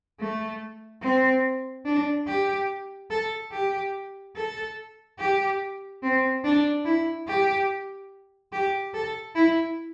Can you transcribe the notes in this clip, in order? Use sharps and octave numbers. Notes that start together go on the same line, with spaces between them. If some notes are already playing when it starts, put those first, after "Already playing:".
A3
C4
D4
G4
A4
G4
A4
G4
C4
D4
E4
G4
G4
A4
E4